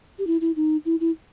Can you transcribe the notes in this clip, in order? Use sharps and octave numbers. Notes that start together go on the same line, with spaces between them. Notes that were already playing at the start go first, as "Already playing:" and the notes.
G4
E4
E4
D#4
E4
E4